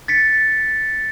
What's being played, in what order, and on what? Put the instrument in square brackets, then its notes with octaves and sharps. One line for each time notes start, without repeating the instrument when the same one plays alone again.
[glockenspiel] A6 B6 C#7